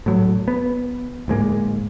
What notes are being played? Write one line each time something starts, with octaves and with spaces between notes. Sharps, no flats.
A2 F#3
B3
D1 G#2 G#3 A#3